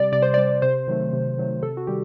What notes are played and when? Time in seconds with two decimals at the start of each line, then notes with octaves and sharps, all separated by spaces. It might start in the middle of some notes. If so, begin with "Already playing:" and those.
Already playing: C3 G3 D5
0.12 C3 D5
0.22 C5
0.34 G3 D5
0.62 C3 C5
0.88 D#3 F#3 A3
1.13 C3
1.38 D#3 F#3 A3
1.63 C3 A4
1.77 F#4
1.87 D#3 G3 G4